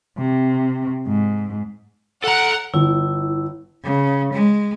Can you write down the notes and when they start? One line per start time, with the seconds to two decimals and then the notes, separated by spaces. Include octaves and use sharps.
0.18 C3
1.08 G#2
2.24 A4 F#5 A#5
2.74 G1 E4
3.83 C#3
4.33 G#3